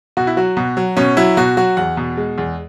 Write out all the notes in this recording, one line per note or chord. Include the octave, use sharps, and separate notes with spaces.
B2 F#4
E4
F#3 F#4
B2
F#3
B2 C#4
F#3 E4
B2 F#4
F#3 F#4
E2 F#5
B2
G#3
E2